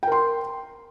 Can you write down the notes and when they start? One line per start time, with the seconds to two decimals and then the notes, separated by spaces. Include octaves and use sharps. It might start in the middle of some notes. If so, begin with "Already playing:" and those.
0.03 G5
0.07 A#4
0.12 C6